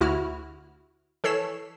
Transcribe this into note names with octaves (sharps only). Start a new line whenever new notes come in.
D2 E4 F#4 F6
E3 A4 C#5 B6 C7 E7